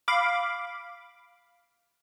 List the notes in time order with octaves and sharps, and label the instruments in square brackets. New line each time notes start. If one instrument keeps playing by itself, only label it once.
[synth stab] F5 B5 D6